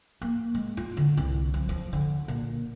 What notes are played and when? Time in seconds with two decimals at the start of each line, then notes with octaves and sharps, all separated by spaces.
0.22 A#3
0.55 G#3
0.77 F4
0.97 D3
1.17 C2
1.54 F3
1.69 F3
1.93 D3
2.28 A#2